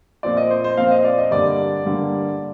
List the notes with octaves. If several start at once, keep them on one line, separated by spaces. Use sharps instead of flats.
A#2 F3 C4 D5
D#5
C5
C5
A#2 F3 C4 F5
D#5
D5
D#5
G2 D3 G3 A#3 D5
G2 D3 G3 A#3